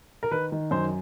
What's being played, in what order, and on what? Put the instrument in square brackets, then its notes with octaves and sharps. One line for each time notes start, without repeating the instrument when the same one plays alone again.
[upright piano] A#4
D#3 B4
D#3
F#2 C5